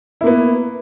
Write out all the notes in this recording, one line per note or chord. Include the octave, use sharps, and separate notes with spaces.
A#3 B3 E4